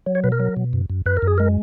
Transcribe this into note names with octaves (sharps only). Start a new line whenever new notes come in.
F#3
C#5
B2 B4
A#4
F#3
B2
F#2
F#2
F#2 B4
A#4
F#2
G#4
G#3 A#4